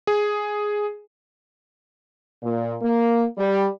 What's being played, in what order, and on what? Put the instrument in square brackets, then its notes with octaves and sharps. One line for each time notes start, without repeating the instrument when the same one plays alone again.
[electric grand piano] G#4
[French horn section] A#2
A#3
G3